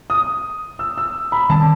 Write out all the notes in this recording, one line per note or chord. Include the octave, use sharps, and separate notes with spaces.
D#6
E6
E6
B5
D#3 G3 C4 A5